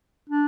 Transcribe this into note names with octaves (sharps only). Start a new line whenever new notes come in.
D4